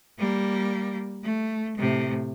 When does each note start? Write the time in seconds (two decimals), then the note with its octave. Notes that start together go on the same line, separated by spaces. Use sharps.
0.18 G3 A#3
1.23 A3
1.77 A2 C3